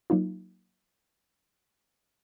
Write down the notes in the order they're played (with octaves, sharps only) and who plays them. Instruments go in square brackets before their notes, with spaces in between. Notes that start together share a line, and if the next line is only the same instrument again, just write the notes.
[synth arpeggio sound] F#3 A#3 D#4 F4